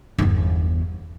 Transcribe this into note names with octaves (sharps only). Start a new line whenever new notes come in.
G1 E2